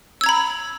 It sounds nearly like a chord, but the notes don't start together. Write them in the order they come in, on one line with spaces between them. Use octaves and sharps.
E6 G#6 A#5 B5